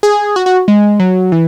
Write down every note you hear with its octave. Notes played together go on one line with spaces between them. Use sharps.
G#4
F#4
F#4
G#3
F#3
E3